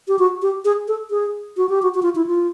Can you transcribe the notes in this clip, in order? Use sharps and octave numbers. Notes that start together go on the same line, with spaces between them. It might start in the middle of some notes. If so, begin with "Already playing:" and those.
G4
F#4
G4
G#4
A4
G#4
F#4
G4
F#4
F#4
F4
E4
F4